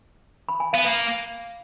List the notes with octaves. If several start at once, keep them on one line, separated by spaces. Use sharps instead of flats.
B5
G#5
B3 F5
A#3 F5